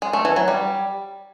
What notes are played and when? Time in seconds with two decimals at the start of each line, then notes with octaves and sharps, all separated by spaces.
0.02 G#3
0.13 A3
0.25 E3
0.36 F#3
0.48 G3